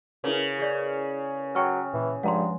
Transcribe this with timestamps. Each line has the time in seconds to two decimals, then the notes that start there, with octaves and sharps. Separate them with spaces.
0.24 C#3 E4 A#4 B4
0.59 G#4 D5
1.55 F#3 G5 C#6 F6
1.94 A#2 E3
2.23 G2 F3 G#3 F#5 A#5 C6